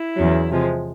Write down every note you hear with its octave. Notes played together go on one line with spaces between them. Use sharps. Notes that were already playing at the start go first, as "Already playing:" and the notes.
Already playing: E4
E2 C#3 F#3
C3 F3 G#3